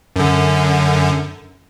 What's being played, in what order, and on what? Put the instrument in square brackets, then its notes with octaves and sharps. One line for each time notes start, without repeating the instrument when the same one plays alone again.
[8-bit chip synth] F#2 D3